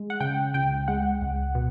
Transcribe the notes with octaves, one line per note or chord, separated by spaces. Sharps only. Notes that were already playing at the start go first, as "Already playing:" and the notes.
Already playing: G#3
F#5
C#3 G5
C#2 G5
G#3 F#5
C#2
B2